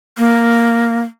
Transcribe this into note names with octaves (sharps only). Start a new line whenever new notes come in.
A#3